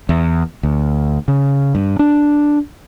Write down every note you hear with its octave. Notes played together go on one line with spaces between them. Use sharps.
E2
D2
C#3
G2
D4